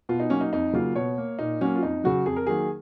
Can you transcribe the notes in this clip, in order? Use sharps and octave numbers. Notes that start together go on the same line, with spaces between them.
B2 F4
D#4
F#3 A#3 C#4
D#4
F2 D#4
C#3 F#3 A#3 F4
B2 C#5
A#3
A#2 D#4
F#3 A#3 C#4
F4
F2 D#4
C#3 F#3 F#4
F2 G#4
A#4
D#3 F#3 A#3 G#4